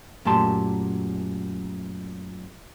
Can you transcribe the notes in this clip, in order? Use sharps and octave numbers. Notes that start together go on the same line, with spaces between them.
F#2 A#2 A3 G4 A5 C6